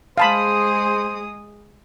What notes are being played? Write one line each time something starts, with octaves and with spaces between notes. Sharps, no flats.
G#3 G#4 C5 F5 A5 B5 D#6